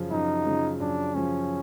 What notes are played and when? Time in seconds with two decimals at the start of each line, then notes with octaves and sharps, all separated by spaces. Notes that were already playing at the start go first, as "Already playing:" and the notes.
Already playing: F#2 C#3 F3
0.11 F#2 D#4
0.46 C#3 F3
0.80 F#2 D4
1.15 C#3 F3 C#4